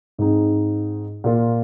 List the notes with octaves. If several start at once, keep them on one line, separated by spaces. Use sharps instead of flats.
G#2 G#3 C4 D#4
A#2 A#3 F4